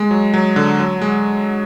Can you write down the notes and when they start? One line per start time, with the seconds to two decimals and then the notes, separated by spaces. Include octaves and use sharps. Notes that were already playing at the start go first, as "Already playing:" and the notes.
Already playing: G#3
0.11 F#3
0.34 F#3
0.56 D3
0.80 F#3
1.01 G#3